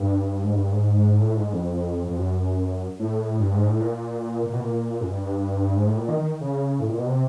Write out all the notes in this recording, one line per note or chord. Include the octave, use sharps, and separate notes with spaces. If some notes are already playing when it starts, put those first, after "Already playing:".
Already playing: G2
G#2
G2
G#2
A2
G#2
F2
F2
F#2
A2
G2
G#2
A2
A#2
A#2
B2
A#2
F#2
G2
G#2
A2
A#2
D#3
D#3
C#3
A2
A#2
B2
C3